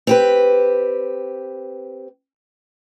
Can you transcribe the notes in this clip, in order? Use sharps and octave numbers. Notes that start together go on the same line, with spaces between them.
C4 G4 B4